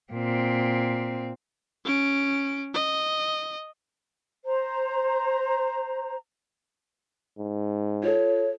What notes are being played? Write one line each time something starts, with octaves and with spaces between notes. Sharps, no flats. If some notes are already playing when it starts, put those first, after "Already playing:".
A#2 C4
C#4 D7
D#5
C5 A#5
G#2
F4 A4 C#5